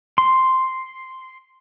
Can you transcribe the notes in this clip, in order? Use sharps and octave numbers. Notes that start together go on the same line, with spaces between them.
C6